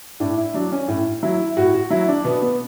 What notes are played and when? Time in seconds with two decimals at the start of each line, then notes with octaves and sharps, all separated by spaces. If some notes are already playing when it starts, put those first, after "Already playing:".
0.20 A2 D4
0.37 E4
0.54 F#3 D4
0.72 C#4
0.88 A2
1.23 F#3 E4
1.57 A2 F#4
1.74 F#4
1.90 F#3 E4
2.08 D4
2.24 B2 B3
2.42 B3